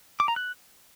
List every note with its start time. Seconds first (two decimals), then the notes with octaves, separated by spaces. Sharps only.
0.20 D6
0.28 A#5
0.36 F#6